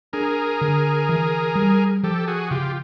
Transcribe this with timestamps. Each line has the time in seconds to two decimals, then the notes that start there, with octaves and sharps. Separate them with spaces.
0.13 D4 G#4 A#4
0.61 D3
1.09 E3
1.55 G3
2.03 F3 G4 A4
2.28 F#4 G#4
2.50 C#3 F4 G4